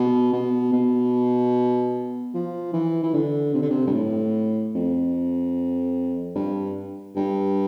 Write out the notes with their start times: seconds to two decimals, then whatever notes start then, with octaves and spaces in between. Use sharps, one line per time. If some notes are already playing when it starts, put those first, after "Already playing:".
Already playing: B2
0.33 B2
0.73 B2
2.34 F3
2.73 E3
3.03 E3
3.14 D3
3.54 C3
3.62 D3
3.70 C3
3.87 G2
3.94 A2
4.75 F2
6.35 G2
7.16 G2